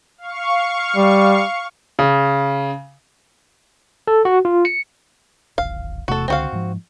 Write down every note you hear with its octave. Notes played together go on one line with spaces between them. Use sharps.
F5 C#6
G3
C#3
A4
F#4
F4
C#7
D1 G#1 F5
E1 C3 A3 F#4 A4
C#2 D3 C4 F#4 F5
G#2 F3